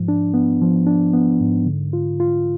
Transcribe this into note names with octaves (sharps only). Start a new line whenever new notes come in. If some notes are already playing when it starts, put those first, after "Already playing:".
Already playing: G#2 F3
D4
B3
F3
D4
B3
G#2
D3
F4
F4